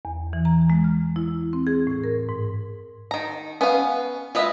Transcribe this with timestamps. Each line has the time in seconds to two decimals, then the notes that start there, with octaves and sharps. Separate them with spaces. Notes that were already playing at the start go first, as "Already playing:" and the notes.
0.05 E2
0.33 E3
0.45 A#5
0.70 G#3
0.84 F6
1.16 E4
1.53 C4
1.67 G#4
1.87 A2
2.04 A#4
2.29 G#2
3.11 D#3 A#5
3.61 B3 C#4 B4 F5 G#5
4.35 G#3 F4 B4 D#5 E5